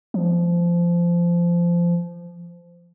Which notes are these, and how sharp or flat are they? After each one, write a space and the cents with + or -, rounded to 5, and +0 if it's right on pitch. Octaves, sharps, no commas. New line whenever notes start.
F3 -20